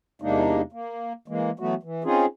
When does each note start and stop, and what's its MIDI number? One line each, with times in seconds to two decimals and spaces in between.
0.22 0.62 40
0.22 0.62 48
0.22 0.62 56
0.22 0.62 58
0.22 0.62 62
0.22 0.62 63
0.72 1.13 58
1.28 1.51 52
1.28 1.51 56
1.28 1.51 58
1.60 1.75 52
1.60 1.75 54
1.60 1.75 57
1.60 1.75 59
1.60 1.75 66
1.83 2.03 52
2.04 2.26 60
2.04 2.26 61
2.04 2.26 63
2.04 2.26 65
2.04 2.26 68